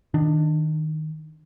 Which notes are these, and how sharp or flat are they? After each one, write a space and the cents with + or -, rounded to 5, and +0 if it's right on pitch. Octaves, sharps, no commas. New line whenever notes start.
D#3 +0 D4 +20